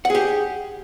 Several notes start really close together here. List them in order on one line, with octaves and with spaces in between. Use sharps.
F#5 G#4 G4